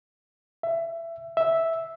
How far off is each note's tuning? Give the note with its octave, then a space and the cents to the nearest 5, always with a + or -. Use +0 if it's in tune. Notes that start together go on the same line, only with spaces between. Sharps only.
E5 +20
E5 -5